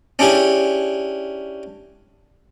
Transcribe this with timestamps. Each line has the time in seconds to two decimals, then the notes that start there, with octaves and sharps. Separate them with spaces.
0.19 C#4 D4 E4 G4 G#4